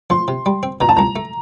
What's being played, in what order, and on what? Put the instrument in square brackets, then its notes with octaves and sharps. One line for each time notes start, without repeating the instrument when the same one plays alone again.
[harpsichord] F3 [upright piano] C6
[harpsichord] C3
G3
C4
[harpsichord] B2 [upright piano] A#5
[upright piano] A5
[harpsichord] C2 [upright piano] A#5
[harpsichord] A3